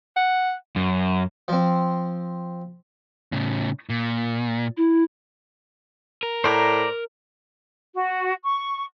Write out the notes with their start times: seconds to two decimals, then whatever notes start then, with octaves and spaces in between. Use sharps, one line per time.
0.17 F#5
0.76 F#2
1.48 F3 C4
3.32 A2 C#3
3.89 A#2
4.77 E4
6.23 A#4
6.44 A2 C5 D5 A#5
7.95 F#4
8.45 C#6